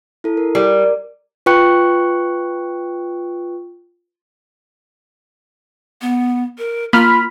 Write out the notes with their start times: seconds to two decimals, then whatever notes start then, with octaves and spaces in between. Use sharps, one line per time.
0.24 E4 A4
0.37 A#4
0.55 G3 A#4 D5
1.46 F4 B4 G5 C#6 F#6 C#7
6.01 B3
6.58 A#4
6.93 A#3 F4 B5 F6